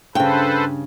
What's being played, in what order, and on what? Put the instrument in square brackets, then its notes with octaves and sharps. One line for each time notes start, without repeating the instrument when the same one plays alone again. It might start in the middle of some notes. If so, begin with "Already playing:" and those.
[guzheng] G2 [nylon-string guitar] C#3 G5 [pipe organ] A4 B4 C5